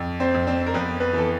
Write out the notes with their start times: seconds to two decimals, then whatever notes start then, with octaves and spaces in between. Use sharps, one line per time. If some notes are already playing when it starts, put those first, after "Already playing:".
Already playing: F2
0.20 C4 C5
0.34 F2
0.47 C4 C5
0.66 A#4
0.74 F2 B3 B4
1.00 B3 B4
1.13 E3 A4